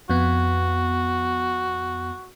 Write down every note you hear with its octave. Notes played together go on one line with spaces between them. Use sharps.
F2 B3 F#4